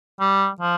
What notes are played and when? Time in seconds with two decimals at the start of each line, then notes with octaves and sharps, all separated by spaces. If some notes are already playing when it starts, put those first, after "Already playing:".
0.20 G3
0.60 F3